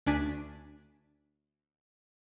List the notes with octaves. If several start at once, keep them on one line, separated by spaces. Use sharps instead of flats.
D2 D4 G#5 B6